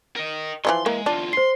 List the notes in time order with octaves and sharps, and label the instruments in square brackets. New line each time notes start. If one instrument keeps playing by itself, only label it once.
[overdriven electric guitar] A#4 D#5
[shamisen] E3 F3 G3 [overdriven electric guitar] C6
[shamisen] E3 A#3 [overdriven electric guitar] G#3
[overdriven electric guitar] E2 F4 [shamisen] D4
[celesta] C5 C7 [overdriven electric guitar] C6